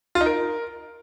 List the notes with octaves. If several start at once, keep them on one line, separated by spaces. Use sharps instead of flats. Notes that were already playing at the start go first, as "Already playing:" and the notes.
F4
D#4
A#4